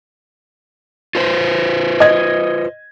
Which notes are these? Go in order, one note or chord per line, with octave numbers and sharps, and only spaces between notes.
F4 B4 C5
D#5 G#6